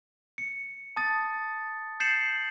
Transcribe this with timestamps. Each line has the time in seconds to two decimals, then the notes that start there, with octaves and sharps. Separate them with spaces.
0.38 C#7
0.96 A5 D#6 A6
2.00 G6 A6 C7 C#7 E7 F#7